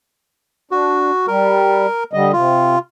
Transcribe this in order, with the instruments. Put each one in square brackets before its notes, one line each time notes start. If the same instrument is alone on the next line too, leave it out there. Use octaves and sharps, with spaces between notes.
[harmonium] D4 [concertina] F#4
[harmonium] G3 [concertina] A#4
[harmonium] D3 G3 D#5
[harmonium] C3 [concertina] F4